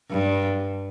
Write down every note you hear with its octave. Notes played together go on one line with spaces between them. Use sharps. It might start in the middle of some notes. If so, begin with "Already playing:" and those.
G2